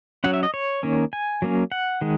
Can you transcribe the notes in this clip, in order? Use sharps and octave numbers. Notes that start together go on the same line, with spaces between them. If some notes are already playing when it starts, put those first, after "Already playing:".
F#3 C#4 F#5
E5
D#5
C#5
D#3 A#3 C#4
G#5
F#3 A#3 C#4
F#5
D#3 G#3